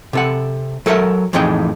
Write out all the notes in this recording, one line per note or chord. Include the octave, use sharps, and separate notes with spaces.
C3 A4 F#5
F#3 A4 A#4 D5 E5
F2 A2 E3 D#4 G#4 G5